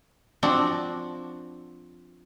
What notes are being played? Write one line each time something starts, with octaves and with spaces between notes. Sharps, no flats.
F3 C4 D4 F#4